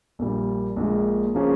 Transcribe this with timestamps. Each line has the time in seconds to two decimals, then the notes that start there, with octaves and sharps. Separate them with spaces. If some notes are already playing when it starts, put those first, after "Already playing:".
0.19 A#1 A#2 G3
0.76 A#1 A#2 G#3
1.35 F3 A#3 C#4 G#4